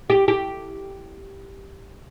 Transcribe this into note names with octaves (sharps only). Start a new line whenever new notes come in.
G4
G4